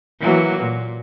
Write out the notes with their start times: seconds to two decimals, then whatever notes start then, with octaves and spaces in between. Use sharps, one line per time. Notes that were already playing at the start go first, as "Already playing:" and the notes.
0.20 E3 F#3 A#3
0.59 A#2